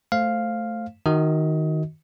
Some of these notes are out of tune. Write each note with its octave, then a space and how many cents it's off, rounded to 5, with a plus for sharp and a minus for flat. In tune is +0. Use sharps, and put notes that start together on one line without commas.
A3 +0 C5 +10 F5 +0
D#3 +0 F#4 +5 D#5 +25